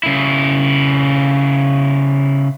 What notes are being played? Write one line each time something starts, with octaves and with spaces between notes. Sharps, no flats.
C#3 E4